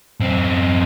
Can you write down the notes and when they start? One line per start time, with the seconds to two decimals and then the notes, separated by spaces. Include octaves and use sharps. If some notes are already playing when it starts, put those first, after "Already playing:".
0.20 F#2 C4